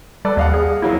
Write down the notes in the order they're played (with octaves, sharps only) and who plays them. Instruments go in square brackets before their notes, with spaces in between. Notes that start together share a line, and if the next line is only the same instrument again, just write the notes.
[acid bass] G3 [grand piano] A4 B4 D5
[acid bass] D#2 [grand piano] D#5 F5 F#5
[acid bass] G#4
[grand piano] F2 F#3 A#3 [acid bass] E4